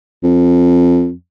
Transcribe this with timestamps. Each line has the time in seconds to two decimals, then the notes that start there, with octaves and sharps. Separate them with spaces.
0.23 F2